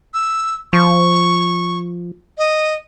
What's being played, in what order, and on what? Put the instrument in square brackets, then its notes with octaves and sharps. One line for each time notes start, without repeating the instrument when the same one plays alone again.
[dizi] E6
[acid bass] F3 [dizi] C#6
[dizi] D#5